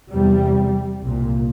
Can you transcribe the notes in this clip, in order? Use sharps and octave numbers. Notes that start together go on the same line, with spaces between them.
E2 C3 G3
C2 A#2